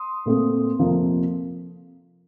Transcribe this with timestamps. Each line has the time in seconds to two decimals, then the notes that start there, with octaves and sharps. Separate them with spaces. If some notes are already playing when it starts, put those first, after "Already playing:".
Already playing: C6 D#6
0.26 A#2 A3 C4
0.79 F2 C3 F3 A#3